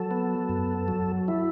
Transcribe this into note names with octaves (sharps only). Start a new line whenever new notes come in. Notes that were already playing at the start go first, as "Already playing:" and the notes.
Already playing: F#3 A4
B3
F#2
F#3
E4